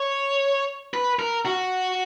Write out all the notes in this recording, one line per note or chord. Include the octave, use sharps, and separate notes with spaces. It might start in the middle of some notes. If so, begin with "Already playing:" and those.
Already playing: C#5
B4
A#4
F#4